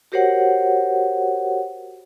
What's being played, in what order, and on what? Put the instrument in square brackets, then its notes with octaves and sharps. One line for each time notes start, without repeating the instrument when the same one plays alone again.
[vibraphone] F#4 G4 A#4 C5 C#5 F#5